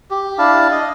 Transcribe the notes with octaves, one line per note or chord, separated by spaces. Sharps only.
G4
D4 E4 F5 A5
D#5